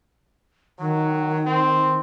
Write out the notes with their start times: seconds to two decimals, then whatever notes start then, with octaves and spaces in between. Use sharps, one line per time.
0.79 D#3 F#3
1.46 C4